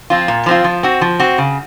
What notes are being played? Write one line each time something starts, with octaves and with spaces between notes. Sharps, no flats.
F3 C4 F4
A#2
F3 C4 F4
F3
C4 F#4
F3
C4 F#4
C#3